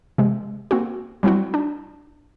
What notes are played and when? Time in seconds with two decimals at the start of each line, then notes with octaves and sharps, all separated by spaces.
0.18 C3 G#3
0.71 A#3 C4 F#4
1.23 F#3 G3 C4 E4 F#4
1.54 D4